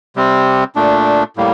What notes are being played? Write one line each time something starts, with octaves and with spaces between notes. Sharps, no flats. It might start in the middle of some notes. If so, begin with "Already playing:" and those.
C3 G3 C4
A#2 A3 D4
A2 G3 A#3